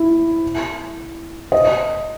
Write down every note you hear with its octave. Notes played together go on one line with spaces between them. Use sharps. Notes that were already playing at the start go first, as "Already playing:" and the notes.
Already playing: E4
D#5